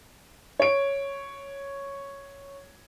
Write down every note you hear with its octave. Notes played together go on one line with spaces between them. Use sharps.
C#5 D7